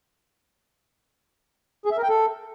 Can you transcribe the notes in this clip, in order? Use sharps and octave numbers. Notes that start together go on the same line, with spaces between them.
G#4
E5
A#4
G5
A4